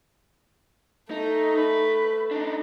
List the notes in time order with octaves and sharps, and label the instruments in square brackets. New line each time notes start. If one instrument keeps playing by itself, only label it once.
[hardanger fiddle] A3 [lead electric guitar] D#4
[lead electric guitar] B4
D4 D#4